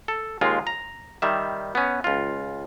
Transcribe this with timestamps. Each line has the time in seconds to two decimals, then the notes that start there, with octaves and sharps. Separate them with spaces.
0.08 A4
0.41 D#2 G#3 F4
0.67 A#5
1.22 D#3 G3 E5
1.75 B3 C#4
2.04 C#2 F4